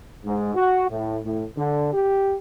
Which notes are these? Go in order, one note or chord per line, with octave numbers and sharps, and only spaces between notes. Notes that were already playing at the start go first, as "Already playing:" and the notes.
G#2
F#4
A2
A2
D3
G4